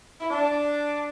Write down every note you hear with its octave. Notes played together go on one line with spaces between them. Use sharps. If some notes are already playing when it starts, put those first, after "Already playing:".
E4
D4 A5